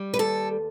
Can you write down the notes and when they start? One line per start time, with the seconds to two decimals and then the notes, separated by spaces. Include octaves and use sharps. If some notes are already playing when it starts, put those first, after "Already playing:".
Already playing: G3
0.14 B4
0.19 D#2 A4